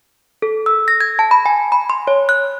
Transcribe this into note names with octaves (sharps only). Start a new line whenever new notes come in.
A4
E6
A#6
G#6
A5
B5
G#5
B5
C6
C#5
F#6